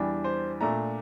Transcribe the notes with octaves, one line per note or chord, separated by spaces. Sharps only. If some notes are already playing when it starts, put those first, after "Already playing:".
Already playing: E2 E3 G3 D4
C5
A#2 A3 D4 A#5